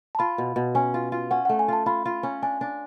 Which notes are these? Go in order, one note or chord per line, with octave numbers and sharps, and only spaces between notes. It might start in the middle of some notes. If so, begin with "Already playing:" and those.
A5
F4 B5
B2
B2
C#4 G#5
F4
F4
C#4 F#5
A3 F#5
G#5
F4 A5
F4 B5
F4
C#4
D4 G#5
D4